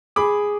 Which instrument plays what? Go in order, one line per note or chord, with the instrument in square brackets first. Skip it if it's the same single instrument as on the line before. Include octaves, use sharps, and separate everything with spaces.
[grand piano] G#4 [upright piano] B5 D6